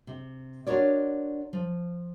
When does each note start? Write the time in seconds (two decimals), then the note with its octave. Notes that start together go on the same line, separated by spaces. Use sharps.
0.07 C3
0.67 D4 F4 F#4 A#4 C#5 D5
1.53 F3